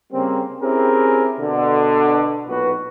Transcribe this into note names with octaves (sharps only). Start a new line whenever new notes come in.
C#3 G3 A#3 C4
C4 C#4 E4 G4 G#4 A#4
B2 D3
B1 A#2 F#4 B4